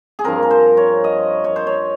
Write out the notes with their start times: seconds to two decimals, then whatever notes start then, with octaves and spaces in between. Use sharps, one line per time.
0.19 G#4
0.24 G2 F3 C4 A#4
0.43 A#4
0.51 C5
0.77 C#5
1.04 D#5
1.44 C#5
1.56 C5
1.67 C#5